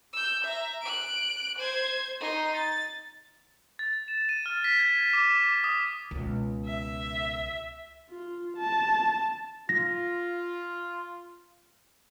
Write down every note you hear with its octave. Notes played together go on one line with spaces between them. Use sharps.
E6 G6
E5 A#5
F#6 D7
C5 G#6
D#4 C6
A6
A6
E7
D#7
F6
B6
G#6
D6
D6
D#6
C#2 B2
E5
F4
A5
F4 A#6